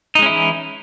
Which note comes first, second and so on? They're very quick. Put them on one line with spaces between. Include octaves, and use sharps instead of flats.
D#4 G#3 C#4 E4 E3